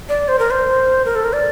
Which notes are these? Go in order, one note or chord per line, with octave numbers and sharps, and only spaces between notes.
D5
C5
A#4
C5
A#4
A4
A#4
D5